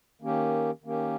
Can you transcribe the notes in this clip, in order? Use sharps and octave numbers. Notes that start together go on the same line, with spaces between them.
D#3 A#3 C#4 G4
D#3 A#3 C#4 G4